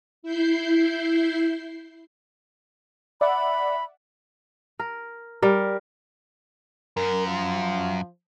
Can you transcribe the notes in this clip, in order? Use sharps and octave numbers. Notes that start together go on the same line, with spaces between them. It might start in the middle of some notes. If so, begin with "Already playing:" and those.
E4 G6 C7
D5 E5 F#5 B5
A#4
G3 A#4
F#2 A#4
F3